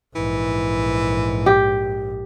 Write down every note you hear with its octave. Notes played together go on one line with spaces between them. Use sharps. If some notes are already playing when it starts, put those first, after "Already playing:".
A#1 G#2 E3
G4